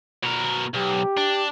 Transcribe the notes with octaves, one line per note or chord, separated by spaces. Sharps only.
B2 A#4
B1 G4
D4